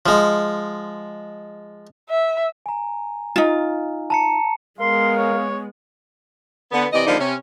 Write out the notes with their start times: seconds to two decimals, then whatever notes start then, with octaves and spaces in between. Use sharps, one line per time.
0.06 F3 G#3
2.10 E5
2.66 G#5 A#5
3.36 D#4 F4
4.10 A5 A#5 C#7
4.81 G#3 B3 A#4 F5 C6
5.17 C#5
6.72 D3 B3
6.92 C3 E3 D5 D#5
7.07 D3 D#3 F3 G3 A#3 D#4
7.19 C3 C#4